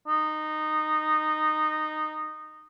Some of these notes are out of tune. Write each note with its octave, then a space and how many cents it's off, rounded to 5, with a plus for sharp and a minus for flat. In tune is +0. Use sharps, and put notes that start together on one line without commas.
D#4 -15